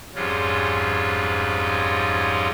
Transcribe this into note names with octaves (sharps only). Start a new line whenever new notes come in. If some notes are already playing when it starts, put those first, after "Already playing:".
F2 G#2 G3 G#3 C#4 F4